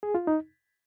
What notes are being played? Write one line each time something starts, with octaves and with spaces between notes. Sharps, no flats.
G#4
F4
D#4